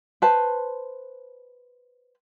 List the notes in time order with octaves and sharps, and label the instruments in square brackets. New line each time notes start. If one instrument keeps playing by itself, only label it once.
[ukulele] B4 C5 A5